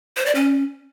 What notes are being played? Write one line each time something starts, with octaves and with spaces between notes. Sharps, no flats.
C5
D5
C#4